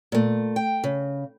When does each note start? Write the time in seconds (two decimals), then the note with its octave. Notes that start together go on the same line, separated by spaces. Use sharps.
0.12 A#2 A3
0.56 G5
0.84 C#3